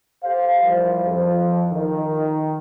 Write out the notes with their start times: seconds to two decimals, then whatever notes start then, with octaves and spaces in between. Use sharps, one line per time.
0.23 G4 A4 C5 F5
0.61 E3 F3 G3 A#4 C5
1.03 F2 F3
1.72 D#3